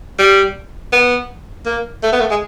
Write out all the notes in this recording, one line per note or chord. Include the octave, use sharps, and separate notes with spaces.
G3
B3
A#3
A3
B3
A3
G#3